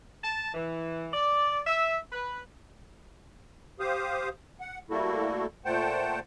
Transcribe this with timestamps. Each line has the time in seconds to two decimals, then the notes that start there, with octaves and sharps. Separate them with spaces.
0.24 A5
0.54 E3
1.14 D5
1.67 E5
2.13 B4
3.80 G4 C5 F5 D#6
4.61 F#5
4.90 G3 A3 A#3 E4 F#4 A4
5.65 A#2 A3 C5 F#5 G5 A5